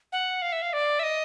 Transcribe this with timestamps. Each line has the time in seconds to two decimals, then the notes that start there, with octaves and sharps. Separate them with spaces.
0.12 F#5
0.42 F5
0.52 E5
0.62 F5
0.73 D5
0.99 E5
1.03 D#5